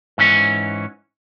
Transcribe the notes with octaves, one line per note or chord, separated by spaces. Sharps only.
G#2 E3 C#4